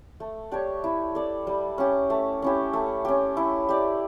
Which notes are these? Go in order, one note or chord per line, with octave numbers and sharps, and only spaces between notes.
A3
D4 G4 C#5
E4
A4 D5
G3
C#4 G4
A3
C#4 E4 G4
A3
C#4 G4
E4
G4 D5